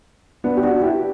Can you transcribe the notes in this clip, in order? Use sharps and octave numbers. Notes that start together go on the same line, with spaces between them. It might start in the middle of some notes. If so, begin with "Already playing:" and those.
B3 D4
G4
D4 F#4
E4 G4